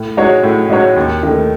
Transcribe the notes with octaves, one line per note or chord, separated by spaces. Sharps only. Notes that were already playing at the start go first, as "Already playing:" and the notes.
Already playing: A2
G#3 D#4 F#4 C#5
A2
G#3 D#4 F#4 C#5
D#2
D#3 A3